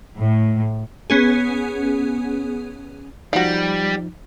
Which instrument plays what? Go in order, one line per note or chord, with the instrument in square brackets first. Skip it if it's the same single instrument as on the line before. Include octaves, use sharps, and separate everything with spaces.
[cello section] A2
[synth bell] B3 C#4 G#4
[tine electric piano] F3 D#4 [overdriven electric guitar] G3 [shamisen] F#4 F5